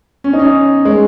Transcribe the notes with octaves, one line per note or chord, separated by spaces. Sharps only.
C#4
D#4
C#4
G#3